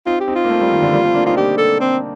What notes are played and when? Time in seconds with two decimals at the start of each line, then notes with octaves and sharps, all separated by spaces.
0.06 C4 D#4 F4
0.20 G4
0.28 C4 D#4
0.36 F4
0.45 A#3
0.49 A3 C4
0.61 G3 A#3
0.71 D#3
0.82 D3 F3
0.93 G3 A#3
1.03 A3 C4
1.14 A#3 D4
1.26 C4 D#4 F4
1.36 A#3 D4 G4
1.58 A4
1.80 C4